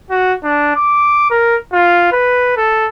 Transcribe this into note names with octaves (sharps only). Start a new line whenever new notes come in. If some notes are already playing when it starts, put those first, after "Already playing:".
F#4
D4
D6
A#4
F4
B4
A4